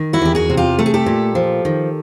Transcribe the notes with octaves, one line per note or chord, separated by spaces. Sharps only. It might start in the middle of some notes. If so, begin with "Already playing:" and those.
Already playing: D#3
E4 F#4
E2 G4
F#4 G#4
C3
F4 G4
A3 A4
G#4
G4 A4
A#2
F3
D#3